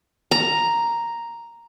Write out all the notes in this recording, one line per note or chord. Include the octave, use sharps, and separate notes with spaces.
A#5